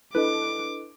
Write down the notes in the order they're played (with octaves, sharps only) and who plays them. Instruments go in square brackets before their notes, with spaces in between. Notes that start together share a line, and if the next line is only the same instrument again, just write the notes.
[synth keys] D4 B4 [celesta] E4 A4 D#5 [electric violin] D6